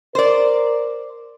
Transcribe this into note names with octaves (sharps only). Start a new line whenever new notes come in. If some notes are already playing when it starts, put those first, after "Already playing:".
A#4 C5 D5